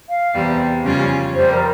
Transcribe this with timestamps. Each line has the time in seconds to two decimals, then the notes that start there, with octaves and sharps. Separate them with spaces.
0.09 F5
0.34 E2 C3 G3
0.84 F2 C#3 G3 C#4 F4
1.34 F2 C3 G3 C5
1.51 A#4